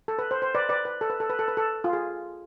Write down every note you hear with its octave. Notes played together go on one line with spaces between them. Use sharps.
A4
B4
C5
C5
B4 D5
B4 D5
B4
A4
B4
A4
B4
A4
B4
A4
F4
G#4